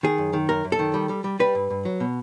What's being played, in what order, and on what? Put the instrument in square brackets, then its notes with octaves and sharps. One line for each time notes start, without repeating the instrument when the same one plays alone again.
[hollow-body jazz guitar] D#3 G#4
F#2
D#3
F#2 A#4
F#2
A4
D#3
G3
G3
G3
G3 B4
G2
G2
F#3
B2